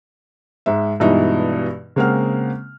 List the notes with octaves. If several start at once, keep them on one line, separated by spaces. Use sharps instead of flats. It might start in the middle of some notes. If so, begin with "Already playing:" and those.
G#2 G#3 E5
G2 B2 E3 G#3 D#4 E5
C#3 G#3 A#3 C4 F#5 F6